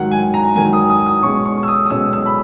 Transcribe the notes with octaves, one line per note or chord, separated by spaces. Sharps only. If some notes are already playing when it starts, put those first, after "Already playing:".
Already playing: G#2 D#3 F#3 F#5
G#5
A#5
G#2 D#3 F#3 G#5
D#6
D#6
D#6
B2 G#3 C#4 C#6
C#6
E6
D#6
D#6
B2 G#3 C#4 E6
E6
B5